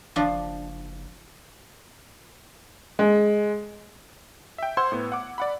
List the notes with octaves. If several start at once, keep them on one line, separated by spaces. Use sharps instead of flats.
F#1 F3 D4
G#3
E5 G5
C5 F#5 C6 E6 G#6
A2 B3
F#5 D6
D5 F#5 B5